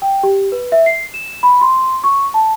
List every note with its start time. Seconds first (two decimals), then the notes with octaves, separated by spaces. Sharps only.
0.02 G5
0.23 G4
0.52 B4
0.72 E5
0.86 C7
1.14 E7
1.43 B5
1.61 C6
2.04 C#6
2.34 A5